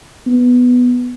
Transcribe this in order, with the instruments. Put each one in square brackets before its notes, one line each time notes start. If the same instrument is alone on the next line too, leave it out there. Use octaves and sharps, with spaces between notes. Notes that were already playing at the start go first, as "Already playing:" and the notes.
[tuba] B3